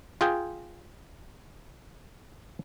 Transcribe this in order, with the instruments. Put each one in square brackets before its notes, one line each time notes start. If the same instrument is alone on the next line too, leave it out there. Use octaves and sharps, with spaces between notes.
[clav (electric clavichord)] F4 G#4 G5